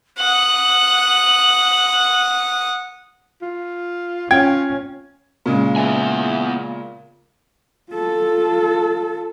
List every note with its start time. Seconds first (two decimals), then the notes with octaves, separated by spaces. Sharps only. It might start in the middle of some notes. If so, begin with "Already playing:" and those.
0.18 F#5 D#6 F#7
3.42 F4
4.31 C#4 F4 G5 G#6
5.46 A#2 C#3 G#3
5.76 B3 E5 G#5
7.91 F4 A4